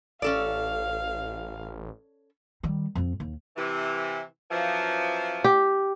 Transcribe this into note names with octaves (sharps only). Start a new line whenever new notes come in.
A1 C#4 A4 D5 F5
D#3 G3
F2 C4
D#2
C3 E3
F#2 E3 F3
G4